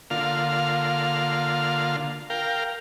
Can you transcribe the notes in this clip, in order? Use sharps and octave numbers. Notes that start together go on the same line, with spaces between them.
D3 A#3 F4 F5
A#4 F5 G5